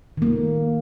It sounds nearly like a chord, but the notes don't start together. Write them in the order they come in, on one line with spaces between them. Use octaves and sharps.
D#3 A#3 A3